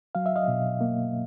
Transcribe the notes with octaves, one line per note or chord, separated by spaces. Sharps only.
F#3 F5
E5
D#5 F5
B2
A#3